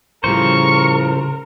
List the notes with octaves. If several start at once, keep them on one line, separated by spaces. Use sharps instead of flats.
A2 C#3 F3 G3 A#4 C5 C#6